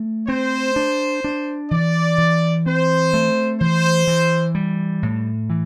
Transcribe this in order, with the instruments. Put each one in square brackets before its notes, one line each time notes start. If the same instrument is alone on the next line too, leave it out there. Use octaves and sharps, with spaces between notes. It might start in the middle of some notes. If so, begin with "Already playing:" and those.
Already playing: [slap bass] A3
[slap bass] C4 [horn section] C5
[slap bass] D4
D4
[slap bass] E3 [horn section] D5
[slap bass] E3
[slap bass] C4 [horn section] C5
[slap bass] A3
[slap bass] E3 [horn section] C5
[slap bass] E3
G3
A2
E3